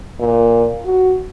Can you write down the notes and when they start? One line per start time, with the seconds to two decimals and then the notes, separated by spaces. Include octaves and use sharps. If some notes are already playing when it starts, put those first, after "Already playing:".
0.19 A#2
0.85 F#4